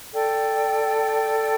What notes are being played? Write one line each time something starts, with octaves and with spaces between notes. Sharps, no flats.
A4 D5 G5